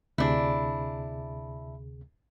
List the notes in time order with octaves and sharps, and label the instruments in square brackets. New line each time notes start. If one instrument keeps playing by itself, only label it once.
[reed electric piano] D2 C3 G#4 [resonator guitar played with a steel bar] D4 E4